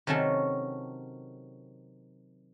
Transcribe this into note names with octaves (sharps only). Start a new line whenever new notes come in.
C3 D#3 F#3 C#4 A4